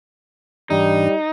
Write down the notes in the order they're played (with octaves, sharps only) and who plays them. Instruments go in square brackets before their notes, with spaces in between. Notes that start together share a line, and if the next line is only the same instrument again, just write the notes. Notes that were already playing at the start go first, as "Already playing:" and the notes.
[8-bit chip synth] G#2 E3 D4 [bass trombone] G3 [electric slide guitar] D#4